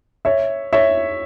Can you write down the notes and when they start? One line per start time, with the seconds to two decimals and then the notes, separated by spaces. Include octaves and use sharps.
0.25 C#5 E5
0.73 C#5 E5